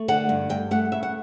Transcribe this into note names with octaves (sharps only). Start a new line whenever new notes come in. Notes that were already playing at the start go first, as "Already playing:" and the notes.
Already playing: A3
D3 F#5
G2
G2 G5
A3 F#5
C#3 E5
F#5